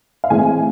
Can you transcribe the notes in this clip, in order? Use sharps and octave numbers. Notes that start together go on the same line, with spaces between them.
F5
A2 E3 G#3 C4 G#5